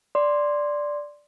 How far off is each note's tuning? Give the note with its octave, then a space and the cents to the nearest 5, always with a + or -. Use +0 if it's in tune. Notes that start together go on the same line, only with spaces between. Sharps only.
D5 +0 C6 +0